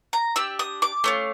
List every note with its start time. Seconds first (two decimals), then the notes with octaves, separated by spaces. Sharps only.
0.13 A#5
0.36 D4 G4 E6
0.59 D#6
0.82 D6
1.04 A3 C#4 F4